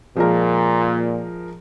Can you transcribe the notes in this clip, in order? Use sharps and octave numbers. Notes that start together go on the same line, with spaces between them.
A#2 F3 G#3 A#4